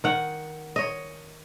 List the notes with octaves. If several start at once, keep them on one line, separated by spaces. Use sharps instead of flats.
D#3 F#5
C#5 D#5